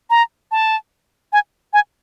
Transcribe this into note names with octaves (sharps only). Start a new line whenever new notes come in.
A#5
A5
G#5
G#5